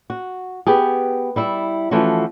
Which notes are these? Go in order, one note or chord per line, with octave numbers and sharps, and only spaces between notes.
F#4
B3 G4 G#4
G3 E4 E5
E3 F3 A3 C#4 F#4